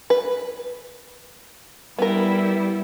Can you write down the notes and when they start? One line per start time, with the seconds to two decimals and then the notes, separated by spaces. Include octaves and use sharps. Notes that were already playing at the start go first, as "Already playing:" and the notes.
0.10 B4
1.98 G3 B3 E4 A#4